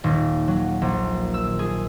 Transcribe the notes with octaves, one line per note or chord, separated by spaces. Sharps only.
D#1
F#3
A#1
E6
G#4